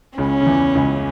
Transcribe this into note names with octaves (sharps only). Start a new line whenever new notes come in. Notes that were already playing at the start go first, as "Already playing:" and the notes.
C#2 C#3 C#4
C#3
E2 E3
C#2 C#3